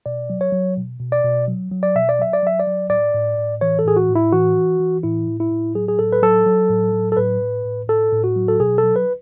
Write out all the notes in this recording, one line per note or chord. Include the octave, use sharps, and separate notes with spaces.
B2 D5
F#3
C#5
F#3
B2
B2
D5
B2
F#3
F#3
D5
B2 E5
D5
F#3 E5
D5
F#3 E5
D5
F#3
A2 D5
A2
A2
E3 C#5
A4
A2 G#4
F#4
A2
E4
E3 F#4
E3
E3
A2 E4
A2
E4
A2
F#3 G#4
G#4
A2 A4
B4
F#3 A4
F#3
A2
F#3
A4
A2 B4
A2
A2
A2 A4
A2
F#4
F#3
A4
B2 G#4
A4
F#3
B4